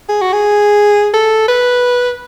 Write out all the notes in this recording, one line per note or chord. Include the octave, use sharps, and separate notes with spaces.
G#4
F#4
G#4
A4
B4